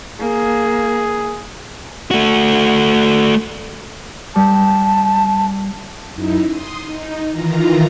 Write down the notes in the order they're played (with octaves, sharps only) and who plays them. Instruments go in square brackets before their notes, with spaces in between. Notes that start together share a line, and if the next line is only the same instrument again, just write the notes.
[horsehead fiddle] A#3 [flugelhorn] G#4
[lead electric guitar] A3 F#4
[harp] G3 [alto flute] A5
[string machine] F#2 D#4 E4
C6 D#6
D#4
D#3 E3 F4 A#5